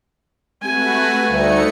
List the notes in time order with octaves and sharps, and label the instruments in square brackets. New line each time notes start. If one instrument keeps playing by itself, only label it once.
[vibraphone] G#3 C4 G4 [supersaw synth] A3 F#4 B4 [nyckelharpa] G#5
[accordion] D2 [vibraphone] G3 F5 [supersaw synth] A3 D#4 C#7